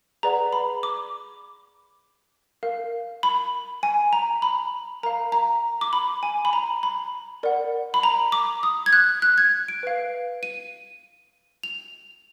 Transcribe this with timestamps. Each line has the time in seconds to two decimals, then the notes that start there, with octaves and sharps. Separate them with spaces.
0.23 G#4 B4 D5 F#5 A#5
0.53 B5
0.83 D6
2.63 A#4 F5
3.23 B5
3.83 G#5
4.13 A#5
4.42 B5
5.03 A#4 F5 A#5
5.32 A#5
5.81 D6
5.93 B5
6.23 G#5
6.45 B5
6.53 A#5
6.83 B5
7.43 A#4 D5 F#5
7.94 B5
8.03 A#5
8.32 D6
8.63 D#6
8.86 G#6
8.93 F#6
9.22 F#6
9.38 G#6
9.68 D7
9.83 B4 F5
10.43 D#7
11.63 F7